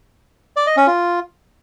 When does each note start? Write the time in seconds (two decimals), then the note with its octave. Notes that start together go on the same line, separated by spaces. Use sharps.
0.56 D5
0.67 D#5
0.77 C#4
0.87 F4